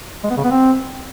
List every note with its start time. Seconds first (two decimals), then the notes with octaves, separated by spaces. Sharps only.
0.24 G#3
0.30 B3
0.37 C#3
0.44 B3
0.51 C4